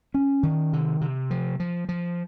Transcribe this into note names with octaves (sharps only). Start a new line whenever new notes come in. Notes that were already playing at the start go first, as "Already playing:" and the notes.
C#4
D#3
C3
C3
F3
F3
F3